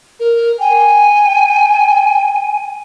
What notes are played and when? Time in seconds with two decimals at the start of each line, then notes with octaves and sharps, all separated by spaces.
0.20 A#4
0.60 G5 G#5